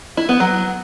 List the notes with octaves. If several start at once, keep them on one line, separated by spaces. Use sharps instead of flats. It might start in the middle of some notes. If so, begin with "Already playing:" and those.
E4
B3
F#3